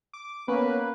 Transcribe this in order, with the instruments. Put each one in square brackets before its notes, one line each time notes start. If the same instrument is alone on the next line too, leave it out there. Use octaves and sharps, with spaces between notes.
[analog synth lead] D6
[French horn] A#3 [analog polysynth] B3 C#4 [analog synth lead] B4